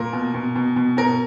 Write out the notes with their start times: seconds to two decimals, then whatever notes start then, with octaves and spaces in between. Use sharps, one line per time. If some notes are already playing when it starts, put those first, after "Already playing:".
Already playing: A#2 A#4
0.13 B2
0.34 B2
0.55 B2
0.76 B2
0.97 B2 A#4